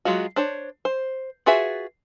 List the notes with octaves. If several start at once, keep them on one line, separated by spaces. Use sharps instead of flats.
F#3 G#3 F4 F#4
D4 C5 C#5
C5
F4 F#4 G#4 B4 E5